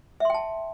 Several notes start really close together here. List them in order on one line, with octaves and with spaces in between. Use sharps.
E5 C6 G5 A5